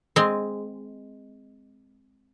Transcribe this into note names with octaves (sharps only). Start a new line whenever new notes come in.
G#3 C4